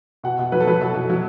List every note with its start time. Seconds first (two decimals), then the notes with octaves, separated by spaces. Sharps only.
0.24 B2 F#5
0.39 B2
0.52 F#3 B4
0.60 A4
0.67 F#3 B4
0.81 B2 A4
0.94 B2
1.10 F#3